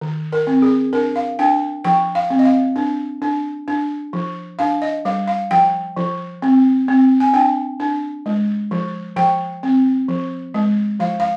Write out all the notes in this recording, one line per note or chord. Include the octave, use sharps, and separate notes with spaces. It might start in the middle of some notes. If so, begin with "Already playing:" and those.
D#3
A#4
C4
G#4
D4 A#4
F5
D4 G5
F3 G5
F5
C4
D#5
F5
D4
D4
D4
F3
D4 F5
D#5
G3 F5
F5
F3 G5
F3
C4
C4
G#5
D4 G5
D4
G#3
F3
F3 G5
C4
F3
G#3
F3 F5
F5